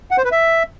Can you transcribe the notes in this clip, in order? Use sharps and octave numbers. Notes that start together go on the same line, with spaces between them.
F#5
C5
B4
E5